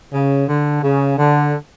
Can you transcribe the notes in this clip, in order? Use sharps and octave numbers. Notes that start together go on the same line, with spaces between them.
C#3
D3
C#3
D3